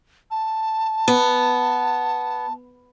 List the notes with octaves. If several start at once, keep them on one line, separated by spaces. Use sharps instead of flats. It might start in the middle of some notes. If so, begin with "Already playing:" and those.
A5
B3